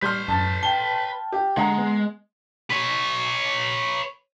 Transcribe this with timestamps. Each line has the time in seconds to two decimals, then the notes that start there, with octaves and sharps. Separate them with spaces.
0.03 G3 B4 C6 F6 G6
0.28 F#2 A5 A6
0.63 G5 A5 G7
1.32 G4
1.57 D3 G#3 F#5 A#5
1.78 B3
2.71 B4 C#5